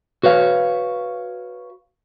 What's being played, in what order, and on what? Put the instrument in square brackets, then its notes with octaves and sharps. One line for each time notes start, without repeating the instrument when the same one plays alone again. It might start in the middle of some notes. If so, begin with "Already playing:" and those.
[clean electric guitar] F#4 B4 C#5 F5